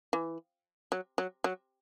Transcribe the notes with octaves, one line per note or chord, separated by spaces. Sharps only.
E3
F#3
F#3
F#3